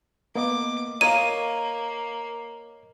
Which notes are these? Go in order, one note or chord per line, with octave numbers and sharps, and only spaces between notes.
A#3 B3 D#5 D6
A#3 A#4 C#5 D#5 F5 A#5 D#7